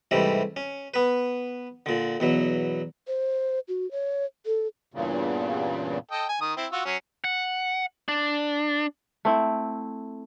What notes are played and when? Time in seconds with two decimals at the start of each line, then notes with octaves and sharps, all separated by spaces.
0.11 G#2 C3 E3 G3 A3
0.56 C#4
0.94 B3 B4
1.86 A#2 D3
2.20 E2 B2 F#3
3.08 C5
3.68 F#4
3.91 C#5
4.46 A4
4.94 E2 G2 A#2 C#3
6.11 A4 D#5 G5
6.29 G#5
6.41 D#3 D#6
6.57 C4 E4
6.72 F4 F#4 E6
6.85 F#3 C#4
7.24 F#5
8.08 D4
9.25 A3 C4 E4